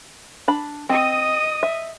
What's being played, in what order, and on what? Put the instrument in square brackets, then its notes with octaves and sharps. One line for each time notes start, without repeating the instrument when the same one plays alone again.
[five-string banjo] D4 B5
[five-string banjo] C4 [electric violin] D#5 D#6
[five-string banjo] E5